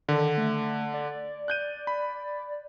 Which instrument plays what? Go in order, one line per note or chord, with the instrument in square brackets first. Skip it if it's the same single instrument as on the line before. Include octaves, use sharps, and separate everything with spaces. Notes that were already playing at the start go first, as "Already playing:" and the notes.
[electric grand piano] D3 [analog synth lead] D#3
[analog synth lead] A3
D5
[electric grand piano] F#6 G6 D#7
B5